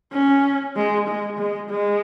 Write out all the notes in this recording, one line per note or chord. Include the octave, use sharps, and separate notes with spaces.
C#4
G#3
G#3
G#3
G#3